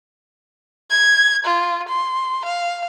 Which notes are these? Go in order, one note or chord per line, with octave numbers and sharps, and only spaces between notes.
G#6
F4
C6
F5